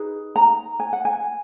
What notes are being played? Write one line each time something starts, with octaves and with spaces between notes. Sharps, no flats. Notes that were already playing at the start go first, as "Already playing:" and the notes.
Already playing: D#4 G#4 B4
A#5
G#5
F#5
G#5